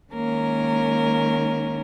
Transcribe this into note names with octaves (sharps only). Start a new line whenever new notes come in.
D#3 G#3 A#3 C#4 A#4